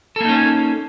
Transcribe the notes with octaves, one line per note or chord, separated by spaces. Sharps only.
A#3 C#4 D#4 A4